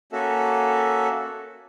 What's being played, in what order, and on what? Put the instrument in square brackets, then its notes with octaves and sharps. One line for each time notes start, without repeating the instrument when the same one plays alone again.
[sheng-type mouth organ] A#3 C#4 F#4 A4 E5